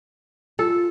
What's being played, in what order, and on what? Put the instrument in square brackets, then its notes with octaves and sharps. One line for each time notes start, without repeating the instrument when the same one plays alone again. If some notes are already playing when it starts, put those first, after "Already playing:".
[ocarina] F4 [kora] A4